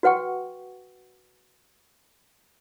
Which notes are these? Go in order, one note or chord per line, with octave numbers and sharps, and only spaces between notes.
F#4 B4 F#5 G5 C#6